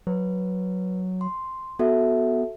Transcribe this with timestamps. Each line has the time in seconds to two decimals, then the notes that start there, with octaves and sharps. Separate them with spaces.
0.07 F#3 B4
1.21 C6
1.79 B3 F#4 A4 E5